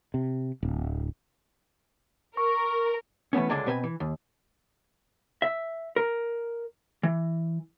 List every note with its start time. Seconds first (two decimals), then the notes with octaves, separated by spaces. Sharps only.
0.14 C3
0.63 D1
2.37 A#4 C#6
3.33 E3 A3 B3 C#4
3.49 C#2 D3 G#3 D4 D5 G#5
3.66 B2 C4 B4 D#5 G#5
3.84 E3
4.00 D#2
5.42 E5
5.96 A#4
7.03 E3